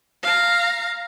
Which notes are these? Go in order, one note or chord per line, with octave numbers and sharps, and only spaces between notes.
F5 A#5